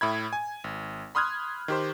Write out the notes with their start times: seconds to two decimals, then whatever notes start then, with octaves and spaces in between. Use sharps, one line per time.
0.01 A2 E5 B5 G#6
0.33 G#5
0.64 G#1
1.15 B5 C6 D#6 F6 F#6 G#6
1.68 D#3 G4 C5